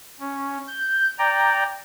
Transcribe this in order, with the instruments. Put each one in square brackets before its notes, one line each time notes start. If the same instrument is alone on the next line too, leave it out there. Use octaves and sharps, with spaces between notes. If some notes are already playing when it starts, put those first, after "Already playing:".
[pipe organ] C#4
G6
D5 G5 A#5